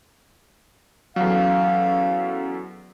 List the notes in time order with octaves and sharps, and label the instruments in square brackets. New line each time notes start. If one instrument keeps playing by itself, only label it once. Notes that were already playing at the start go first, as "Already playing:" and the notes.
[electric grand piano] E2 F#3 [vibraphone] C#4 A4 [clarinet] F5